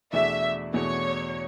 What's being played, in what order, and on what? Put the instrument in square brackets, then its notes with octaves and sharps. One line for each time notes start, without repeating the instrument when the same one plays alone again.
[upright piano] E2 B2 A3 D4 G#4 [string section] E5
[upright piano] E2 B2 A3 D4 G#4 [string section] C#5